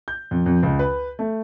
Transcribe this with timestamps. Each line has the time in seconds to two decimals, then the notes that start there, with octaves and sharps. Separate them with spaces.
0.08 G6
0.31 F2
0.46 F2
0.63 C#2
0.79 B4
1.19 A3